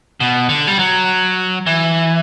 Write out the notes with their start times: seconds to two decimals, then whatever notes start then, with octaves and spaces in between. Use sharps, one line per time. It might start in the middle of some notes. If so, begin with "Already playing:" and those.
0.20 B2
0.49 D3
0.67 G3
0.79 F#3
1.67 E3